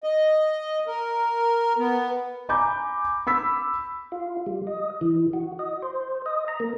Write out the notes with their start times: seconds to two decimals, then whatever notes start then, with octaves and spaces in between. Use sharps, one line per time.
0.04 D#5
0.87 A#4
1.78 B3
2.49 G#5 A#5 B5 D6 G6
3.27 B5 E6 B6
4.12 F4
4.46 G3
4.67 D#5
5.01 E3
5.33 F#4
5.59 D#5
5.82 C5
6.26 D#5
6.48 A#5
6.60 A#3